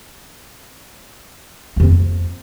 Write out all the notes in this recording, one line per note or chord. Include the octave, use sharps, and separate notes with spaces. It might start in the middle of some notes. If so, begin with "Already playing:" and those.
F2 A#3